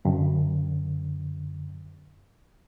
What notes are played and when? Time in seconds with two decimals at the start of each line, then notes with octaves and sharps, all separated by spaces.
0.05 F#2 D3